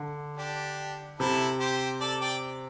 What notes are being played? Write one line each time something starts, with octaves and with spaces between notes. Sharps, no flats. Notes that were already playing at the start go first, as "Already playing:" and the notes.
Already playing: D3
D4 G4
C3 E4 A4
G4 C5
A4 D5
D5 G5